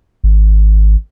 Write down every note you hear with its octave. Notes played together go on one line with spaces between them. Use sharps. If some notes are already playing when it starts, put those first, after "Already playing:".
G#1